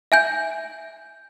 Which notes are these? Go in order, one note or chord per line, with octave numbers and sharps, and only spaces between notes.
E5 G#5 G6